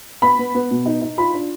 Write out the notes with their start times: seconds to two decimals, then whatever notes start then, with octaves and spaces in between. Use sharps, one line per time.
0.22 B3 B5
0.39 B3
0.55 B3
0.71 B2
0.86 D#4
1.02 D#4
1.18 F4 B5
1.34 D4